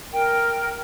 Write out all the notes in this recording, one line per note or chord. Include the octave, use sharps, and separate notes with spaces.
A#4 G5